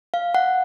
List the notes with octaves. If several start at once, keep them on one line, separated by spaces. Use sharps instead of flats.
F5
F#5